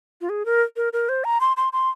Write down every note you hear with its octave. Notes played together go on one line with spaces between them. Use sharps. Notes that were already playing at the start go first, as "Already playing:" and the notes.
F4
G#4
A#4
A#4
A#4
C5
A#5
C6
C6
C6